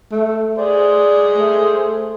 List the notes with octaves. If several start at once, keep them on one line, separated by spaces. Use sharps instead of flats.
A3
G#4 C5 D5
A3